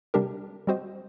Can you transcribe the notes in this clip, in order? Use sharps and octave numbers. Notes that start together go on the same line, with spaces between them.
C3 G3 D4 G4 A#4
G3 C4 F#4 C5 D#5